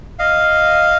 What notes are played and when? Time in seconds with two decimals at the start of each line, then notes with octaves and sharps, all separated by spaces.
0.19 D#5 F5